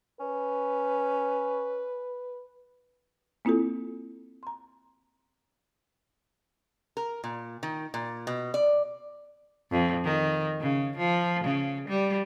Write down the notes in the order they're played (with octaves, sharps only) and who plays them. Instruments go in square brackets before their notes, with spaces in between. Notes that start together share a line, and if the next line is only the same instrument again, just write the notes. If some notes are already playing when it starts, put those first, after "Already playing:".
[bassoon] C#4 [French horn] B4
[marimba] A#3 C4 E4 F4 A4
A#5 C6
[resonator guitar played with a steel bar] A#4
A#2
D#3
A#2
B2
D5
[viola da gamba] F2
D#3
C#3
F3
C#3
G3